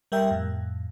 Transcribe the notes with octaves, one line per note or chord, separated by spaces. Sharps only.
G3 A#4 E5 G5
F2 A2